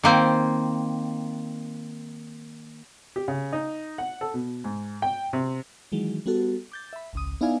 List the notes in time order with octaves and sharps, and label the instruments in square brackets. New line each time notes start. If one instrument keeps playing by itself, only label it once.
[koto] D#3 A#3 C4
[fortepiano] G4
C#3
D#4
F#5
A4
B2
G#2
G5
C3
[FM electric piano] D#3 E3 F#3 G#3
G3 B3 F#4 A4
D6 G6 A6
E5 B5
G#1 C#2 D#6
B3 D#4 E4 D5 F5 G#5